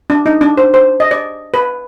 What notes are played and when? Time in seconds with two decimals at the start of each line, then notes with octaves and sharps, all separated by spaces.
0.10 D4
0.26 D#4
0.41 D4
0.57 C5
0.74 C5
1.00 D#5
1.11 D5
1.54 B4